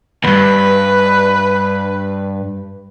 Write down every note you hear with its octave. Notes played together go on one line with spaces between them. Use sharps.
D2 G2 B4